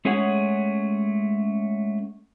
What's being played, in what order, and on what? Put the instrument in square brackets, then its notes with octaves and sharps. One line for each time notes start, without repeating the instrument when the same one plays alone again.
[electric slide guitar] G#3 A3 C#4 G#4 C#5 F#5